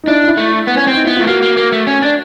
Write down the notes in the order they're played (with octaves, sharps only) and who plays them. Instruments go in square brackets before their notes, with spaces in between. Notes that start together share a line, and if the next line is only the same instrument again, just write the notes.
[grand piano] D#4
[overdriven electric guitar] D4 [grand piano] E4
[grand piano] D#4
E4
[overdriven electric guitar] A3
[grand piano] E4
[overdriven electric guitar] B3
C#4
C4
[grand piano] D#4
[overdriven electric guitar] B3 [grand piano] E4
[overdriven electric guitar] A3 [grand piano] F4
[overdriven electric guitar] A#3 [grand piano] F#4
[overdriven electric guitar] A#3
A#3
A3
C#4
D4